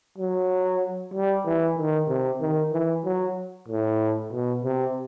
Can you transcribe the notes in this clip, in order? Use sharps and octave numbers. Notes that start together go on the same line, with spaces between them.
F#3
G3
E3
D#3
C3
D#3
E3
F#3
A2
B2
C3